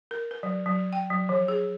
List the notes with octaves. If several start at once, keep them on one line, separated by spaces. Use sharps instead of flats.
A#4
B4
F#3
F#3
G5
F#3
F3
G#4